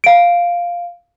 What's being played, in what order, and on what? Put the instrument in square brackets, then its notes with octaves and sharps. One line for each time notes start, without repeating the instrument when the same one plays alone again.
[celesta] F5 D7